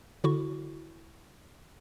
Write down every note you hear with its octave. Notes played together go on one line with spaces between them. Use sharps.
D3 E4 F#4 C#6